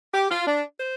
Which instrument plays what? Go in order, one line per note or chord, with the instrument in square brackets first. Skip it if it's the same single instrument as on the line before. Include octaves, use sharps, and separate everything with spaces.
[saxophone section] G4
F4
D4
C5